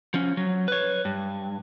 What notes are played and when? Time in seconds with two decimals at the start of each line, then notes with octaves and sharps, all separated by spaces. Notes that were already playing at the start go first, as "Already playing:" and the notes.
0.14 F3 C#4
0.37 F#3
0.68 B4 C#5
1.05 G2